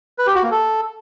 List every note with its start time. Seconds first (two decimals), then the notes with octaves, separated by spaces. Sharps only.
0.19 B4
0.27 G4
0.35 F#4
0.43 A#3
0.51 A4